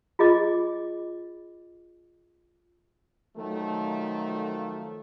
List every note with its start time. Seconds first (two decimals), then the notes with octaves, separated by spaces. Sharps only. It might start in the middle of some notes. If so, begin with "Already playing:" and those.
0.19 F4 G#4 D#5 D6
3.37 D#3 F3 F#3 A3